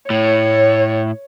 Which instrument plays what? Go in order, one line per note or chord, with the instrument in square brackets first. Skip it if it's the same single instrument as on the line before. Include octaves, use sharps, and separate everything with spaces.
[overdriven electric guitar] A2 [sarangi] C#5